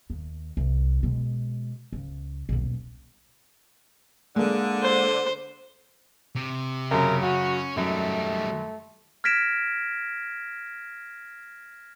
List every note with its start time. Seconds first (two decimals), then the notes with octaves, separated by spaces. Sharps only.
0.10 D#2
0.57 C2
1.03 B2 G#3
1.93 C#2
2.49 D#1 B1
4.36 D3 G#3 A#3
4.83 C5
6.35 C3
6.91 F#2 C#3 A#4
7.22 C#4 F#4
7.77 F#2 G3 A3 D#4
9.24 F6 G#6 A#6 B6 D7 E7